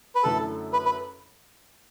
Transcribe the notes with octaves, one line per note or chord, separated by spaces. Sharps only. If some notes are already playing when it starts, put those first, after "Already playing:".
B4
F#2 D3 A3 E4 A4
B4
B4